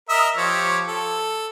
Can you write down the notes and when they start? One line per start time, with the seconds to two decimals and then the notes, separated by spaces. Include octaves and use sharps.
0.09 A#4 D#5 E5
0.37 F3 G4 C#5
0.87 A4